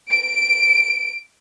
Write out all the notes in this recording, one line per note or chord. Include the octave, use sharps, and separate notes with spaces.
D7